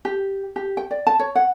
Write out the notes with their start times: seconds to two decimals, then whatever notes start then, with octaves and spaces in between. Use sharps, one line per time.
0.05 G4
0.56 G4
0.77 G5
0.91 D5
1.07 A5
1.19 C#5
1.35 F#5